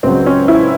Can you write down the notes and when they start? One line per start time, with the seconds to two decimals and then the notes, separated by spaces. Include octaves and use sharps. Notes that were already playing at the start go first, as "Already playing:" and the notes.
0.03 C#2 C#3 F#3 C4
0.26 C#4
0.48 E4